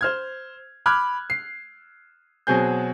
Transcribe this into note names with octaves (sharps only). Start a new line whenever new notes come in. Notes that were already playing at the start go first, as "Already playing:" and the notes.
C5 F6 G#6
B5 D6 F6 F#6 G#6
C7
B2 F#3 C4 G#4 G#5 G6